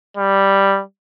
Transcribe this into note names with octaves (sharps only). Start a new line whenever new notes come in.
G3